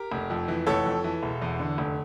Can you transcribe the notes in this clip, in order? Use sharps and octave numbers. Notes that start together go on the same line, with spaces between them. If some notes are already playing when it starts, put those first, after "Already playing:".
Already playing: G4 A#4
F1
F2
E3
F1 A4 C#5
F2
E3
E1
E2
D3
F1